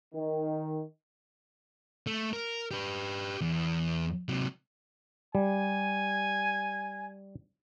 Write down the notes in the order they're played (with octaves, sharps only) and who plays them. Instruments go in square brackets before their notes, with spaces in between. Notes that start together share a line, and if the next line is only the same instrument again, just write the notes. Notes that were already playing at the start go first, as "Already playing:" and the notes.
[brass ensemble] D#3
[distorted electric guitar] A3
A#4
G4 B4
E2
C3 F#3
[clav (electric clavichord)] G3 [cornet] G#5